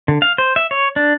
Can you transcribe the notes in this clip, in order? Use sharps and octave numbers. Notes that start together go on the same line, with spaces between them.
D3
F5
C5
E5
C#5
D4